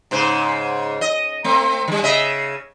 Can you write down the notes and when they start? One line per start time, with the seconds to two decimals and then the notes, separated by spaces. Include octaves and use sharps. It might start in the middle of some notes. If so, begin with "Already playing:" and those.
0.11 G#2 C#3 C5
1.01 D#5
1.44 A3 C4
1.88 D#3 G3
2.03 C#3 D#5 E5